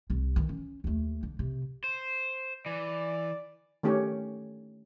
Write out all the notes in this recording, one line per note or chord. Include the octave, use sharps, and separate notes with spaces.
C2 C3
D#3 E3
C#4
D#2 A3
D3
C3
C5
E3 D5
D#3 A3 C#4 G4 C#5